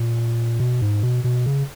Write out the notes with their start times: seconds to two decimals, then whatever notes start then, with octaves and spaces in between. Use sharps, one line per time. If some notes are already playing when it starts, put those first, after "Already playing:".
Already playing: A#2
0.60 B2
0.81 G#2
1.03 B2
1.24 B2
1.46 C#3